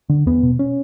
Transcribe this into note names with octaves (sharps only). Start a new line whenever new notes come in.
D3
E2 B3
B2
C#4